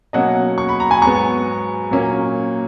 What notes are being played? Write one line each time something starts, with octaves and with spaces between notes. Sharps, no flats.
B2 F#3 A#3 C#4 D#5 F#5
C#6
B5
A#5
G#5 B5
G#2 F#3 B3 A#5 C#6
A#2 F#3 A#3 C#4